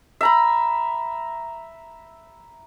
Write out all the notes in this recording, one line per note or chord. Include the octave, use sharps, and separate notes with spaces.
E5 A#5 B5